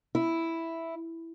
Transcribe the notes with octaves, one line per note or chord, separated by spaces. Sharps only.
E4